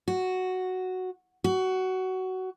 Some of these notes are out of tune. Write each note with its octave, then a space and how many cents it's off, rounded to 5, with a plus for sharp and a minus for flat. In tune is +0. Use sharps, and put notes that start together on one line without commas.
F#4 +0
F#4 +15